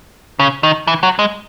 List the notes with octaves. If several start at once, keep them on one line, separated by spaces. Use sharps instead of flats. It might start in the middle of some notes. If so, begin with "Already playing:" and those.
C#3
D#3
E3
F#3
G#3